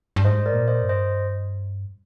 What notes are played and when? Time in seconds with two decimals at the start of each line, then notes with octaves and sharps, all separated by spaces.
0.16 G2
0.25 G#2 C5 D#5
0.46 A#4 D5
0.53 A#2
0.68 C5 D#5
0.82 G2
0.89 C5 D#5